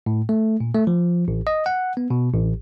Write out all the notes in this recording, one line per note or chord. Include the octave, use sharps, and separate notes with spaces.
A2
A3
A#2
A3
F3
A1
D#5
F#5
B3
B2
A1